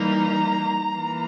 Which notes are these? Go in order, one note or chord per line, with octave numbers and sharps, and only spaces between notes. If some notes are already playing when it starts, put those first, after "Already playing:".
Already playing: E3 G3 A#3 D#4 A#5
E3 A#3